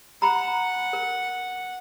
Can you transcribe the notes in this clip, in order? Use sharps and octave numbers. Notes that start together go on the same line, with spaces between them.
F#5 A#5 B5
A#4